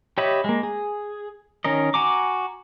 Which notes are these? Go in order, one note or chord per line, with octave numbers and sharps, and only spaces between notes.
G4 C#5 D#5 E5 B5
G#3 A#3
G#4
D#3 C#4 A#4 D#5
F#4 G#5 A#5 D6